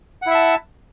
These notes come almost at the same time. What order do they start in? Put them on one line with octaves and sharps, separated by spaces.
F#5 E4 E5 A5